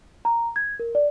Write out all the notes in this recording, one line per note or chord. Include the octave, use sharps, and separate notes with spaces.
A#5
G#6
A#4
D5